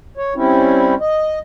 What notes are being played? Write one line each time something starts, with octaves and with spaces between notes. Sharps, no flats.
C#5
G3 C4 C#4 E4
D#5